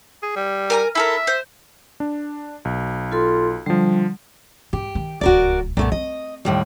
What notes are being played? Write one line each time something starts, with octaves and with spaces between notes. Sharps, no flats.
G#4
G3
A#4 G#5 A#5
E4 A4 A#4 E5
C5
D4
B1
F4 A4 C6
D3 F3 G3
G#2 G4
D#3
D1 C#2 F#4 A#4 D5
C2 A#2 A3 B3
C4 D#5
D#2 A2 G3